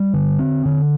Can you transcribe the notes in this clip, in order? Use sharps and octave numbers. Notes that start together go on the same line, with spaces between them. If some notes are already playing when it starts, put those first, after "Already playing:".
Already playing: G3
D3
C4
D3